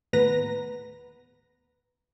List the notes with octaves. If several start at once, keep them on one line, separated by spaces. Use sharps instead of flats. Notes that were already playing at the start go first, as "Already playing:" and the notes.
D#2 A2 B3 B4 A#5 A#6